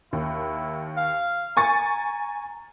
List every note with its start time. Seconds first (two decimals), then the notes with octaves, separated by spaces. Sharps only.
0.13 D#2 E4
0.98 F5
1.57 G#5 A#5 C#6 A6